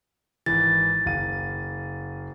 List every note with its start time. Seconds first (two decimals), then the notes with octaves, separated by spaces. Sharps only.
0.46 G#1 E3 A6
1.06 F#1 F5 D#7